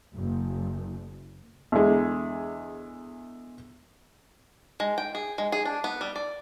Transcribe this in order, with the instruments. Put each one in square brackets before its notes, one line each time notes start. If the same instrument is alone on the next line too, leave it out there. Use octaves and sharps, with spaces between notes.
[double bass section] F#1
[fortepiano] E2 D3 G#3
[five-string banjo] G#3
G5
G#4
G#3
G#4
D4
B3
G3
D5